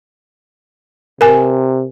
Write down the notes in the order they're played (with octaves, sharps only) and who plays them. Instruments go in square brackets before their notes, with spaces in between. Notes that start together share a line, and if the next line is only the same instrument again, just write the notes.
[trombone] C3 [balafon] A#4 G#5